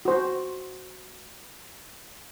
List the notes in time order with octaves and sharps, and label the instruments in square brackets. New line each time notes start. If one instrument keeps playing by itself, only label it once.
[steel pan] F#4 C5